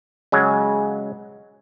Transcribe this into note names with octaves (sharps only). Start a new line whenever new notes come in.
C#3 F#3 G#3